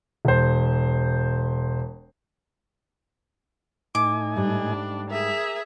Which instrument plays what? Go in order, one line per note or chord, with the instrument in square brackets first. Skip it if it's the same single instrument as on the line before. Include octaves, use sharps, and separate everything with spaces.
[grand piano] E1 C5
[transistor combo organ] A2 D#4 G#5 [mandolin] D6
[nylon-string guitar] G#2 G3 A3 [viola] D4
[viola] G#4 E5 [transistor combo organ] A#4